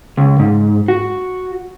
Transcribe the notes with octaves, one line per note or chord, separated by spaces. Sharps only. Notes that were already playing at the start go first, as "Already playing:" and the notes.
C#2
G#2
F#4